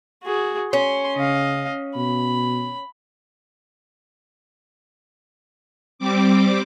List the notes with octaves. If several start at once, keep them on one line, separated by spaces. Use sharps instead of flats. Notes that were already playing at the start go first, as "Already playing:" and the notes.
F#4 G#4
C#4 C6
C#3 D#5 F5
B2 B5
G3 C4 D6